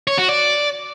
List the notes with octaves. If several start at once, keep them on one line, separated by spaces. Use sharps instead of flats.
C#5
F#4
D5